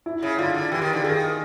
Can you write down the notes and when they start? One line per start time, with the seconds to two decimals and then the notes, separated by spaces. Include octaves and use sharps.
0.06 E4
0.23 C#3
0.38 D3 F4
0.54 D3
0.71 E3 G4
0.82 D#3
0.93 D3
1.04 D#3 G#4